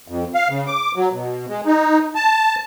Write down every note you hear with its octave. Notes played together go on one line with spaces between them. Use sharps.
F2
F5
C#3
D6
F#3
B2
G#3
D#4
A5